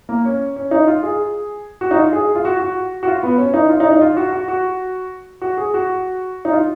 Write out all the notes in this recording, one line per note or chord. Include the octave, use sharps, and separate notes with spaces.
A#3
C#4
C#4
D#4
F4
G#4
F#4
D#4
F4
G#4
F4
F#4
F#4
F#4
F4
B3
C#4
D#4
F4
D#4
D#4
F4
F#4
F#4
F#4
F#4
G#4
F#4
D#4
F4